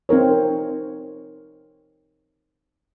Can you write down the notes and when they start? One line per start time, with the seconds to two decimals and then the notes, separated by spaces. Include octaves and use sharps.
0.09 C4 D#4 A#4 C#5